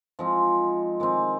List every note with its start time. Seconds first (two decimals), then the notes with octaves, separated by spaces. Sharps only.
0.19 F3 G#3 C4 D#4
1.00 D#3 G#3 C4